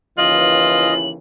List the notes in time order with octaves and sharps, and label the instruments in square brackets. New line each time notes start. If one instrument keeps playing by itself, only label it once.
[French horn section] D#2 C#3 E3 [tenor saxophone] F4 [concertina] D#5 [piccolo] F#7